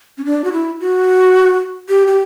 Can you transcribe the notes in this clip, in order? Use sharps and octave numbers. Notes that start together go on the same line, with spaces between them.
C#4
D4
F#4
E4
F#4
G4
G4